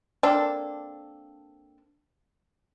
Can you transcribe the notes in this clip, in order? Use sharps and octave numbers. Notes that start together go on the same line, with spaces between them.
A#3 C4 D4 A4